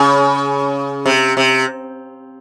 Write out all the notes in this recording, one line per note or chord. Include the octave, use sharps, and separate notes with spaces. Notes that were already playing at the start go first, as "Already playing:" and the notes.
Already playing: C#3
C3
C3